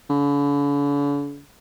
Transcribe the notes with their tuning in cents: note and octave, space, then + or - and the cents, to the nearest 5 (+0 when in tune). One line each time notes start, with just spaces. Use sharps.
D3 -45